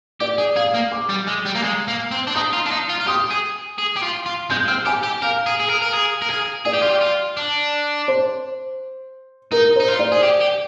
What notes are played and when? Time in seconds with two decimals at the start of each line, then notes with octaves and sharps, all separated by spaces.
0.20 G4 D5
0.38 G#4
0.56 G#4 F5
0.74 A#3
0.92 D6
1.10 G3
1.28 G#3
1.46 G3
1.55 A#3
1.64 G#3
1.88 A#3
2.11 C4
2.27 D4
2.35 D#4 D#6
2.53 F4
2.66 D4
2.71 D#4
2.89 F4
3.00 F4
3.07 G4 D#6
3.31 G#4
3.78 G#4
3.96 G4
4.03 F4
4.26 F4
4.50 G#3 G6
4.68 C4 F6
4.86 G4 G#5
5.04 G4
5.22 A#4 F5
5.46 G#4
5.60 G#4
5.70 A#4
5.82 A#4
5.93 G#4
6.22 A#4
6.30 G#4
6.65 G#4 D5
6.74 G4
6.82 F4
6.90 G4
7.01 F4
7.37 D4
8.08 C5
9.52 D#4 A#4
9.76 D#4 C5
9.88 F4
9.99 D5
10.12 G#4
10.23 G4
10.41 G4